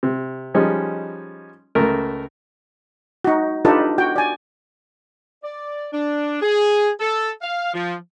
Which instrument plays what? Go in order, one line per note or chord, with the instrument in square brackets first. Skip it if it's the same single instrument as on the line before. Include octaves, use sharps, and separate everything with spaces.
[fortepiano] C3
F3 G3 G#3 C#4 D#4
C#2 A3 A#4
[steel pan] D#4 F#4
D4 D#4 F4 G4 A4 B4
F#4 G5
D5 G#5
[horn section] D5
D4
G#4
A4
F5
F3